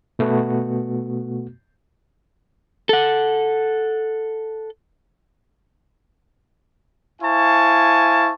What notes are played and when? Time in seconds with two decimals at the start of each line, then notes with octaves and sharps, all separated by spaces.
0.19 B2 A3 B3 F#4
2.89 A4 F#5
7.22 E4 C5 F5 G#5 A5 C#6